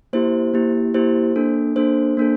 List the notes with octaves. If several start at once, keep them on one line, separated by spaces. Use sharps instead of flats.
A#3 E4 G4 C5
A#3 E4 G4
A#3 E4 G4 C5
A#3 D4 A4
A#3 D4 A4 C5
A#3 D4 A4